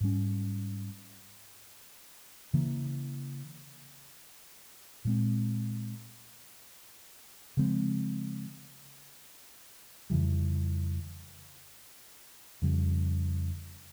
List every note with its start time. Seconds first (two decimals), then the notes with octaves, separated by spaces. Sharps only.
0.01 G#2 G3 C#4
2.54 C#3 E3 A#3
5.05 A#2 G#3 C4
7.57 C#3 F3 G#3 C4
10.10 F2 C#3 E3 G3
12.62 F2 C#3 G3